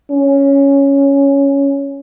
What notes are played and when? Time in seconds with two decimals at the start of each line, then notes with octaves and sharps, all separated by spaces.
0.11 C#4